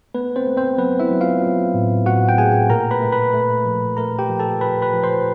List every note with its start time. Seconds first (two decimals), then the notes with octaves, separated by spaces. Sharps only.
0.15 A3 B3 B4
0.36 C4 C5
0.47 A3
0.57 C4 C5
0.78 F#3 B3 B4
1.00 E4 E5
1.11 F#3
1.21 F4 F5
1.42 F#3
1.74 A2
2.06 A2 F#4 F#5
2.29 G5
2.38 A3 G#4 G#5
2.70 A#2 A#4 A#5
2.91 B4 B5
3.02 A3
3.12 B4 B5
3.34 A3
3.65 F3
3.97 A3 A#4 A#5
4.19 G4 G5
4.29 F3
4.40 A4 A5
4.61 F3 B4 B5
4.82 B4 B5
4.93 F3
5.03 C5 C6